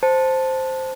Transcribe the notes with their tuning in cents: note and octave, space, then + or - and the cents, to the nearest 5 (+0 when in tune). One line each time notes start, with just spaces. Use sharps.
C5 +0 A5 +0